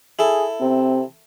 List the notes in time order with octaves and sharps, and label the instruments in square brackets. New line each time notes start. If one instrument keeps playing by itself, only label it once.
[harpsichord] E4 A4 [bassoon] G#4
[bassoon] C3 [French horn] C4